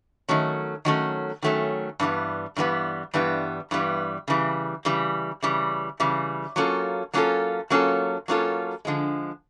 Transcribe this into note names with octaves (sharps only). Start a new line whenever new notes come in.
D#3 F#3 A3 C#4
D#3 F#3 A3 C#4
D#3 F#3 A3 C#4
G2 E3 G3 B3
G2 E3 G3 B3
G2 E3 G3 B3
G2 E3 G3 B3
C#3 E3 G3
C#3 E3 G3
C#3 E3 G3
C#3 E3 G3
F#3 A#3 C#4 F4 A4
F#3 A#3 C#4 F4 A4
F#3 A#3 C#4 F4 A4
F#3 A#3 C#4 F4 A4
D3 F3 G#3